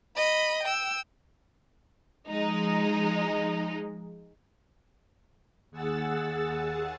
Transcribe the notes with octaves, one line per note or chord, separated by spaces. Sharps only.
D#5 B5
G5 E6
F3 G#3 D#4
D#2 G#4 F#5 E6 A6